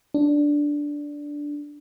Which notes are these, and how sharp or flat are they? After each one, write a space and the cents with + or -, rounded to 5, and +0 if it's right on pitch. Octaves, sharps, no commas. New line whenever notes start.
D4 -5